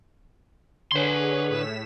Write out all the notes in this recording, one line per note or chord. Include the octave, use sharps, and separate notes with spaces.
D3 G#4 B4 C#5 C6
A2 B6 E7